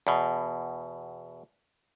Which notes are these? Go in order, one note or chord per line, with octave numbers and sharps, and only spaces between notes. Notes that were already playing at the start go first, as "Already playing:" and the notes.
E2 B2